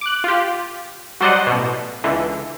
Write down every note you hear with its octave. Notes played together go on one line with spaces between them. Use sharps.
D6 F#6
F4 G4
F#3 G3 C5 D5 D#5 F#5
A1 B2
C#2 D3 E3